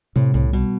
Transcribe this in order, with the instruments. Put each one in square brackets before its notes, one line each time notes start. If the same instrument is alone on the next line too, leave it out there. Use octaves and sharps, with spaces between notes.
[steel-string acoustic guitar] A2 [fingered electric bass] C3
[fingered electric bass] C2 [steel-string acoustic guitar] A2
[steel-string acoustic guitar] B2 [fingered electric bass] G3